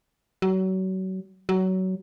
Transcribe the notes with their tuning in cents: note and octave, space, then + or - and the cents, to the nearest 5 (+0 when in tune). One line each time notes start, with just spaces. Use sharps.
F#3 +30
F#3 +20